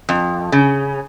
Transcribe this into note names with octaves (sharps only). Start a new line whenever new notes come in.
F2
C#3